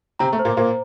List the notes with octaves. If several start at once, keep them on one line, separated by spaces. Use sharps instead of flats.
C3 C4 A#5
A3
C5
A#2 A#3
A#2 A#3 C5